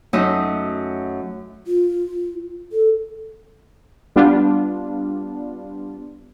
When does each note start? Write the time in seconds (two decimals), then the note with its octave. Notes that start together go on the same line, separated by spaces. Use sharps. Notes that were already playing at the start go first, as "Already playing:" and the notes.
0.13 F#2 A3 D#4 E5 D#6
1.67 F4
2.72 A4
4.16 G3 B3 D4 F4